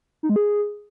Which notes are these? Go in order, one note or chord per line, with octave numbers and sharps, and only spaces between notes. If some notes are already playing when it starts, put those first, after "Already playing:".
D#4
G#3
G#4